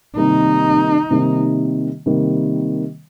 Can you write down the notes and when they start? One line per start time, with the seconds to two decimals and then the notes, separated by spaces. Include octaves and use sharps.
0.16 C3 D#3 G3 A#3 D#4
1.11 C3 D#3 G3 A#3
2.06 C3 D#3 G3 A#3